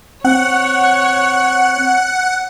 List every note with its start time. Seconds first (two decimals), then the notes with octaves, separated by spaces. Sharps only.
0.25 C4 C#5 F#5